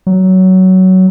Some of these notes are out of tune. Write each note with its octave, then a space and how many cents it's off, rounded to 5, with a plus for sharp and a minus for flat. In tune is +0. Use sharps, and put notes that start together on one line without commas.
F#3 +15